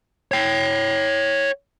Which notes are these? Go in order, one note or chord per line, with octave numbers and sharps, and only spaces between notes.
C#5 G5